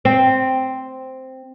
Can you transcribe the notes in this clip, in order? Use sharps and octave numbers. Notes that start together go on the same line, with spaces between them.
C4